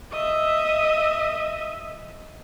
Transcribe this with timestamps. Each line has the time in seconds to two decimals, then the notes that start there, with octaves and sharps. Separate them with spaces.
0.12 D#5 E5